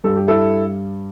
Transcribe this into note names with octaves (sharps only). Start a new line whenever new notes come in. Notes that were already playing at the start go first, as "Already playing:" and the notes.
G2 G3 A4
G4
E4 A4